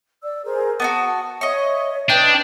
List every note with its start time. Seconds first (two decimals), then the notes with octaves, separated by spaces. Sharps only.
0.23 D5 E6
0.44 G#4 A#4 C5
0.80 B3 D4 F#4 A5
1.41 C#5 D#5 E5 C#6
2.10 D4 B4 D#5 G5